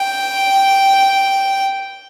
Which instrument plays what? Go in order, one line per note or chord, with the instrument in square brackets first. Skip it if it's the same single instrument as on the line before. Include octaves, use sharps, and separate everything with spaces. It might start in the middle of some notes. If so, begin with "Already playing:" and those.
Already playing: [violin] G5